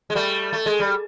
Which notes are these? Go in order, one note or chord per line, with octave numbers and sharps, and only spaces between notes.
G#3
G3 A3
A3
G#3
G3